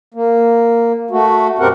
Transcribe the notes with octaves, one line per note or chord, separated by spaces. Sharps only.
A#3
A3 F#4
F#2 B2 C4 G4 A#4 F#5